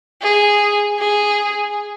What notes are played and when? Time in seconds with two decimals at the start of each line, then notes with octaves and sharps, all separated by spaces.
0.22 G#4
0.99 G#4